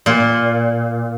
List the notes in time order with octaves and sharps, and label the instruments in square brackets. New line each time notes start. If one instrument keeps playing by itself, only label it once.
[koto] A#2